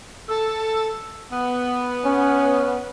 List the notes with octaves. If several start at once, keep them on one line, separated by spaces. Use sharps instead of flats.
A4
B3
C#4